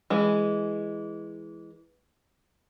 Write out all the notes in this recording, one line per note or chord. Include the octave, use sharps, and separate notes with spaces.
E3 G#3